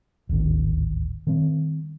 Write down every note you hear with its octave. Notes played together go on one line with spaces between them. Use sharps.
D1 G#1 D#2 D#3
D#3 G3 C4